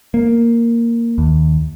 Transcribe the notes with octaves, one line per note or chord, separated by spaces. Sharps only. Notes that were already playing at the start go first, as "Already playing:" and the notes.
A#3
D#2